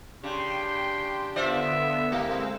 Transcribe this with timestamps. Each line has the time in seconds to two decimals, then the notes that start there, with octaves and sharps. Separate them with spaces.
0.24 C#3 D4 G4 G5 C6
1.36 D3 B3 F4 C5 D5 E5
2.12 G#3 A3 C4 E4 G4 A#4 E6